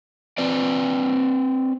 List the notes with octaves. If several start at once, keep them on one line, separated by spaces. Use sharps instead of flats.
C4 B4 D5